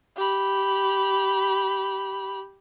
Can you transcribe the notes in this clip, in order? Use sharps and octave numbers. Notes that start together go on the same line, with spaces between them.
G4 B5